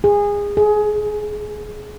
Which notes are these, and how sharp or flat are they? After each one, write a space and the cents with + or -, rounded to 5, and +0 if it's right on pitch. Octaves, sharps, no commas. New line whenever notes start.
G#4 -25
G#4 +20